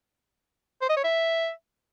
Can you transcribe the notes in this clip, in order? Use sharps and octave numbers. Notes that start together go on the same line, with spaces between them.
C5
D#5
C#5
E5